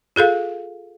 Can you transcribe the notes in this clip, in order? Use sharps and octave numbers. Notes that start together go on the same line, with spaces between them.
F4 G#4 A4 F5